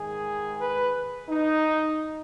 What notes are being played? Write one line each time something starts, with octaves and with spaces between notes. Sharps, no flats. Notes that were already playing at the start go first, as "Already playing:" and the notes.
Already playing: G#2 D#3 G#3 G#4
B4
D#4